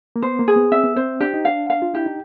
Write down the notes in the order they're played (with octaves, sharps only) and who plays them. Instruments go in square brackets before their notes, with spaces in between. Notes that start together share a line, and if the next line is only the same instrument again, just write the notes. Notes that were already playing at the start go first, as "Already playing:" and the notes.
[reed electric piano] A#3
[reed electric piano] B3 [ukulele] C5
[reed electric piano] A#3
[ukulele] G#4
[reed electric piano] B3
[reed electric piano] C4 [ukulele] E5
[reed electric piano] B3
[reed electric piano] C4 [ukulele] C5
[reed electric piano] D4 [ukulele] G4
[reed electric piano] D#4
[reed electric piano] D4 [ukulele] F5
[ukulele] F5
[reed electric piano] F4
[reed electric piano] E4 [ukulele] G4
[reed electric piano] D#4